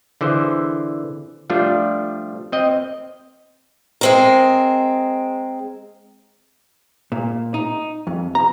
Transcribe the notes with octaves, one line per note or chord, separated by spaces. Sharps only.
D3 E3 G#4 C5
F3 G3 A3 D4 F4
C4 D#5 G5
G#3 C4 A#4
A#2
D#4
F2
A#5